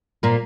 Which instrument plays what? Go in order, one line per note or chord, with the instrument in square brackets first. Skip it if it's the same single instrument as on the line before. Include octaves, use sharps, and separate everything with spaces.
[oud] A#2 A#3